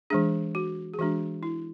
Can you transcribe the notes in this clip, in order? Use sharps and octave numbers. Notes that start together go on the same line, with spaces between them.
E3 G#3 D4 G#4
F#4
G#4
E3 G#3 D4 F#4
E4